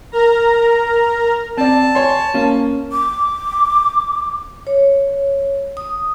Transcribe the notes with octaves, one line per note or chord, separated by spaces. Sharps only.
A#4 A#5
C4 D5 A5
C#5 G#5 C6
A#3 C#4
D6
C#5
D#6